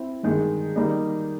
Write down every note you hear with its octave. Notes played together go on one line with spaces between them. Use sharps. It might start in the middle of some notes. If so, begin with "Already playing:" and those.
Already playing: C4 E4
G2 D#3 G#3
D#3 G3 A#3 D#4